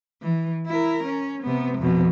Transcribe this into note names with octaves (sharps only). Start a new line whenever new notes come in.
E3
E4 A#4
C#4
C3 B3
F2 B2